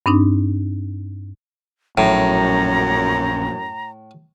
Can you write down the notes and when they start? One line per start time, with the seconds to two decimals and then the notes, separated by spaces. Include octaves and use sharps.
0.06 G2 C4 D4 D#4
1.98 A#1 F#2 A2 F#3 A#5